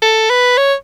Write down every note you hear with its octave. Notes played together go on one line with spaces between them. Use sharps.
A4
B4
C#5